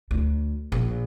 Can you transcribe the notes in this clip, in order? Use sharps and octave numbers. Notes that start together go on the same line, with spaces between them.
D2
A#1